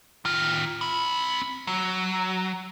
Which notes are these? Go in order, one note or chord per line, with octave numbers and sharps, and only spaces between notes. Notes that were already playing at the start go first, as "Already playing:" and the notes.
D#3 F4
C4 B5
F#3